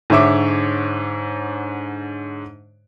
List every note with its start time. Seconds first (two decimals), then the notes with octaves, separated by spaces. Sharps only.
0.10 G#2 D3 C#5 E5 D6